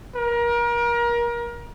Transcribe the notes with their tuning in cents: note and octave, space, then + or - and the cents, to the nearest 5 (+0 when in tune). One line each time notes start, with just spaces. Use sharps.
A#4 +30